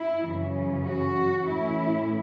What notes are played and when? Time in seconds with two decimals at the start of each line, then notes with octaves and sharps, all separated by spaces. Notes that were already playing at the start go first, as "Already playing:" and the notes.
Already playing: E4
0.24 F#2 C#3 E3 C#4
0.85 F#4
1.47 A2 E3 C#4 E4